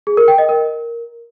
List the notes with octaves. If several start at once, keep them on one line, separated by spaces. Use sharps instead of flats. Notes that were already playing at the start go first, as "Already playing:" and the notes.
G#4
A#4
G5
D#5
A#4